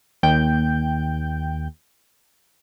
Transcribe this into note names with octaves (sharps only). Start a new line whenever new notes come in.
D#2 G5 G6